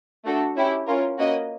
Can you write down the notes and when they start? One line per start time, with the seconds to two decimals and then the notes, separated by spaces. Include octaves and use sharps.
0.25 A3 D4 F#4 A4
0.56 C#4 E4 G4
0.87 C#4 F4 A#4
1.18 A#3 C#4 F#4 B4 D#5